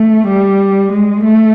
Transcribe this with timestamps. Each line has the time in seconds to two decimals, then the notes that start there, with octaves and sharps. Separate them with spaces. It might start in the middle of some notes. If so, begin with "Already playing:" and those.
Already playing: A3
0.28 G3
0.93 G#3
1.24 A3